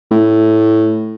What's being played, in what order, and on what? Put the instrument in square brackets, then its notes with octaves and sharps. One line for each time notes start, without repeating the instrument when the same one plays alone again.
[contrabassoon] A2